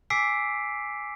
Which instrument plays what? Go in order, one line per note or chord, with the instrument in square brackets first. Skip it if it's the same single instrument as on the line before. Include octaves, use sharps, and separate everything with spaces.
[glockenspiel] G#5 D6 E6 B6 C7 D7